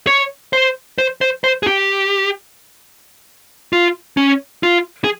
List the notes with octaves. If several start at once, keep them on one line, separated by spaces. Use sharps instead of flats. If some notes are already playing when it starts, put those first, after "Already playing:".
C#5
C5
C5
C5
C5
G#4
G4
F4
C#4
F4
G#4